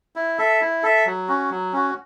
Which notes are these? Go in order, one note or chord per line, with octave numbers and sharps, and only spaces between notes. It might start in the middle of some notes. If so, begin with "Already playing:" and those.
E4
A4 E5
E4
A4 E5
F#3
C#4 F#4
F#3
C#4 F#4